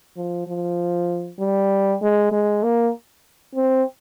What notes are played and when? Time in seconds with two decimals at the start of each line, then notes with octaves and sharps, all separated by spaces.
0.17 F3
0.48 F3
1.40 G3
2.02 G#3
2.32 G#3
2.63 A#3
3.55 C4